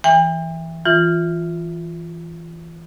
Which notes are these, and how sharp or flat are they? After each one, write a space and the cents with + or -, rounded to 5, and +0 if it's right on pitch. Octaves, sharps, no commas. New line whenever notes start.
E3 +0 G5 +45
E3 +0 F4 +0